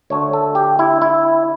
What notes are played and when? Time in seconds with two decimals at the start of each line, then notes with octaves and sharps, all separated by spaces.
0.10 D2 D3 A3 C#5
0.33 A4
0.55 G4
0.79 E4
1.02 E4